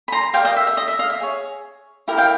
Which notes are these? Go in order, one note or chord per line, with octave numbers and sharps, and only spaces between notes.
B5
A#5 C6
G4 A#4 D5 F5 G5
D#5 F5
E5
E5
D#5
E5
D#5 F5
E5
G#4 C#5
E4 G4 A#4
F5 G5